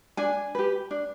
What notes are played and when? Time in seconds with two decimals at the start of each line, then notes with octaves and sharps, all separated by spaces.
0.17 D4 G#5
0.55 G4 B4
0.91 D4